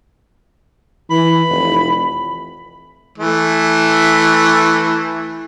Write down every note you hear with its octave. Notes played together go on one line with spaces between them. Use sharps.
E3 B5
F1
E3 A3